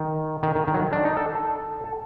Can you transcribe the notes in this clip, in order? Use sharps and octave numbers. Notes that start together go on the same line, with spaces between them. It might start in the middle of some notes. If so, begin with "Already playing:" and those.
Already playing: D#3
D#3
D#3
D#3
F#3
D#3
D4
D#4
A4
A4
A4